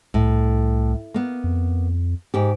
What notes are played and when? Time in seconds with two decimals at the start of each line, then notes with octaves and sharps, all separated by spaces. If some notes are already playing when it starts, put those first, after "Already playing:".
0.14 C2 A2
1.14 A#3 B3
1.44 F2
2.34 G#2 G4